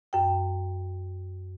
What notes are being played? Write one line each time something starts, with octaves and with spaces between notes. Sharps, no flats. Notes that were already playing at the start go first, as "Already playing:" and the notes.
F#2 G5